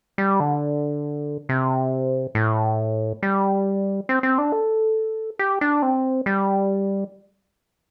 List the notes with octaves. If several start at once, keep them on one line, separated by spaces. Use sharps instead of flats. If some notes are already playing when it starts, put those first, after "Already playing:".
G3
D3
C3
A2
G3
C4
C4
D4
A4
G4
D4
C4
G3